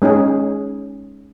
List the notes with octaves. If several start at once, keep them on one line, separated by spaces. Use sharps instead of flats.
G#3 C#4 D#4 G#4